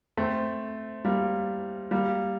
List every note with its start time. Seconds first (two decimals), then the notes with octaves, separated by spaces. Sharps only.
0.17 A3 C4
1.05 G3 A#3
1.91 G3 A#3